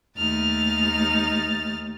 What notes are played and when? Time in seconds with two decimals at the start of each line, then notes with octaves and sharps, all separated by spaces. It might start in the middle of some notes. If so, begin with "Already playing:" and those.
0.18 D#2 A3 D#4 F6 A6